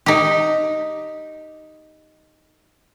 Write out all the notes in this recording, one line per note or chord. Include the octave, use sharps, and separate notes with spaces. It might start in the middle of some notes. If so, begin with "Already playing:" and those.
D#4 G4